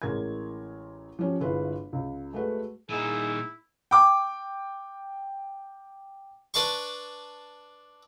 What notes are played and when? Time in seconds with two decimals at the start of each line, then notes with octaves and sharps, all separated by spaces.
0.02 A1 G#3 A#4 G#6
1.19 F3 C#4 G4
1.40 G1 G#3 E4 F4 B4
1.93 C#2
2.33 G#3 A3 F#4 B4
2.90 A#2 D#4 E4 G#4
3.91 G5 D6
6.54 D4 B4 D5 A5 C6 C#6